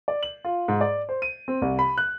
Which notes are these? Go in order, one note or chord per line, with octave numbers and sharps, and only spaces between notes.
D5
F#7
F4
G#2
D5
C5
D#7
C4
C2
B5
F#6